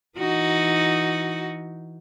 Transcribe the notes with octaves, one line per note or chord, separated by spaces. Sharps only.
E3 D#4 F#4